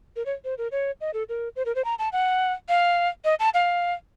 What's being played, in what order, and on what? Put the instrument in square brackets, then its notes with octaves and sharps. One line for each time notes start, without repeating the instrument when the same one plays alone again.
[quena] A#4
C#5
C5
A#4
C#5
D#5
A4
A#4
C5
A#4
C5
A#5
A5
F#5
F5
D#5
A5
F5